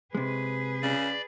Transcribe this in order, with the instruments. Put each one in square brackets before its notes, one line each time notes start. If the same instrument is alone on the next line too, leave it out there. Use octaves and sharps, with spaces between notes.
[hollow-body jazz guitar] C3 G#3 [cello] G#4 B4
[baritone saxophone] C#3 [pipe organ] D5